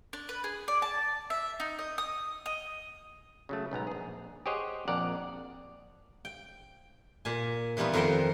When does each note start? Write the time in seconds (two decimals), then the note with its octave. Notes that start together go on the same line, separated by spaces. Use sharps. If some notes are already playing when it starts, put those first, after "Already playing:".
0.13 D4
0.29 B4
0.44 G#4
0.68 D5
0.82 A5
1.30 E5
1.60 D#4
1.79 D#5
1.98 D#6
2.46 D#5
3.49 C#3 F#3 A3
3.71 B1 G#2 B3 A#5
3.87 A#1 G#4
4.46 G4 G#4 C5 C#5 D#5 F#5
4.88 A#1 F2 A#4 D5 F#5
6.25 G5
7.25 A#2 G#5
7.77 E3 G3 B3 D#4 F4
7.93 F2 D#3 A#4 C5 F#5 G5